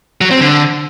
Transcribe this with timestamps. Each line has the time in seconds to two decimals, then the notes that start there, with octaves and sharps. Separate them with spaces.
0.21 F#3
0.31 C4
0.41 D3